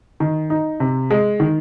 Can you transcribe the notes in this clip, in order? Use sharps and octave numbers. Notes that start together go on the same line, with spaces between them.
D#3
D#4
C3
G#3
D#3